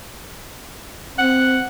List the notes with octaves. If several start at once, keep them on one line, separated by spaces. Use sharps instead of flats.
C4 F#5